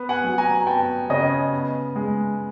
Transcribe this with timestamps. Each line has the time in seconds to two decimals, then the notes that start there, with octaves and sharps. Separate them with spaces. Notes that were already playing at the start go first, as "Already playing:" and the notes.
Already playing: B3
0.09 F#5 G#5
0.24 F#3
0.38 G#5 A#5
0.67 B3 G5 A5
1.10 C#3 C#5 D#5
1.53 B3
1.96 G#3